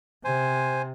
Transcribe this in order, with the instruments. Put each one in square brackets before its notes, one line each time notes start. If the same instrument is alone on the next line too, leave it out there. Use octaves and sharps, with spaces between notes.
[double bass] C3 [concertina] C5 G#5